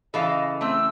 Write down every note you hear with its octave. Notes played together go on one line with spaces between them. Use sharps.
C#3 E3 A4 D#5 F5
A3 C4 E6